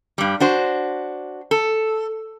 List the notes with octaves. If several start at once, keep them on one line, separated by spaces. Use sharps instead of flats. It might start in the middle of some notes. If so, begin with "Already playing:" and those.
G2 G3
D4 F#4 C5
A4